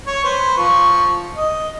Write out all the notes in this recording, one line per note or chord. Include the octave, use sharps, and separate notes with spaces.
C#5
B4 C5
F3 C#6
D#5